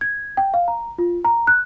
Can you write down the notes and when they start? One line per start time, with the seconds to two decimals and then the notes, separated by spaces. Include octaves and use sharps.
0.01 G#6
0.37 G5
0.54 F5
0.68 A#5
0.98 F4
1.25 A#5
1.47 F#6